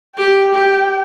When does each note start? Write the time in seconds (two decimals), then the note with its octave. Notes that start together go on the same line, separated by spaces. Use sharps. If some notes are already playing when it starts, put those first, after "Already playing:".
0.17 G4 G5
0.54 G4